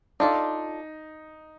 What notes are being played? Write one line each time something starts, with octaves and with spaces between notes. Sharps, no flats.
D4 D#4 F4 A4 D5